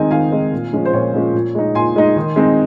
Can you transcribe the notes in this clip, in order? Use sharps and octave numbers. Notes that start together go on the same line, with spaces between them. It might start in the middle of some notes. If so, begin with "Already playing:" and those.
Already playing: D#3 G#3 C4 D#4 G#5
D#3 F5 G#5
G#3 C4 D#4
A#2
F3 G#3 C#4
C5
A#2 C#5
F3 G#3 C#4
A#2
G#3 D#4
A#2 G#5 C6
G#3 D#4
D#3
G#3 C4 D#4